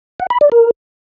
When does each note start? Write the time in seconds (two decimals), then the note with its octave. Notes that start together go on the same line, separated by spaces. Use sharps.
0.20 F#5
0.30 B5
0.41 D5
0.52 A#4